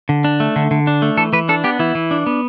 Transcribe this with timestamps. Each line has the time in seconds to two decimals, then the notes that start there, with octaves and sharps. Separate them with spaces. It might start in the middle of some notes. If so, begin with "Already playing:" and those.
0.09 D3
0.24 D4
0.40 A3
0.56 D3
0.71 D3
0.87 D4
1.02 A3
1.17 E3 A4
1.33 E3 B4
1.49 D4 A4
1.64 B3 G4
1.79 E3 E4
1.95 E3
2.11 D4
2.26 B3